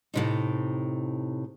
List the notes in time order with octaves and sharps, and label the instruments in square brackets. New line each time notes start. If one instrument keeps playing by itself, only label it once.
[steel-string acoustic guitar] A2 C3 D#4